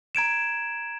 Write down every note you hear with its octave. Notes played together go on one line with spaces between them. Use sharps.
A#5 G#6 D7 E7